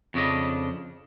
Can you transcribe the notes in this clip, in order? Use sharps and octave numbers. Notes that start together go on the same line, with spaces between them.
F2 C#3 D4 D#5